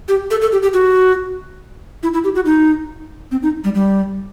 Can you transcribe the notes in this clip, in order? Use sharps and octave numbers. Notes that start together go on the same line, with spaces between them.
G4
A4
A4
G4
G4
F#4
E4
E4
G4
F#4
D#4
C4
D#4
G3
G3